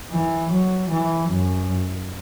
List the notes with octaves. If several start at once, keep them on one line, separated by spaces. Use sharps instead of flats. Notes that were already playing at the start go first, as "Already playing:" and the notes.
E3
F#3
E3
F#2